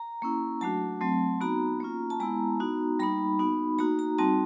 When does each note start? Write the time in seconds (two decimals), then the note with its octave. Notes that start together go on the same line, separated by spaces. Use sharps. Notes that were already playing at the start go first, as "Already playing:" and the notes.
Already playing: A#5
0.22 A#3 C#4 E4
0.61 F#3 A3 D4 F#4 A5
1.01 F#3 A3 C4
1.41 B3 D#4 F#4 A#5
1.80 A#3 C#4 F4
2.10 A5
2.20 G#3 B3 E4 A#5
2.60 B3 D#4 F#4
2.99 G3 A#3 D#4 B5
3.39 B3 D#4 F#4
3.78 A#3 D#4 F#4 A#5
3.99 A#5
4.18 G3 C4 D#4 F#4 A5